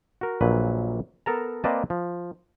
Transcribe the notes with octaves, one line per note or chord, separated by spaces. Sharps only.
F#4 A#4
A#1 A#2 F#3 B4
B3 A4 A#4 A5 A#5
A#3 C4 B4 D5 D#5 A5
F3